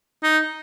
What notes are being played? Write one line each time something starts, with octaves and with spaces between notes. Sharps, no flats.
D#4